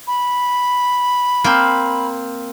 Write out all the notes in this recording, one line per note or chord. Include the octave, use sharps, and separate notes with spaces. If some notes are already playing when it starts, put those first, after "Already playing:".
B5
A#3 C4